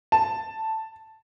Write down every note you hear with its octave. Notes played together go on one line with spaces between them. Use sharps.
A5